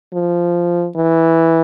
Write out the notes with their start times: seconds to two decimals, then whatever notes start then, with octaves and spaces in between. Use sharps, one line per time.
0.13 F3
0.96 E3